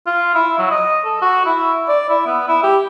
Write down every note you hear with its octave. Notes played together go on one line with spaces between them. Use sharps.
F4
E4
F#3
D#5
A4
F#4
E4
D5
E4
B3
E4
G4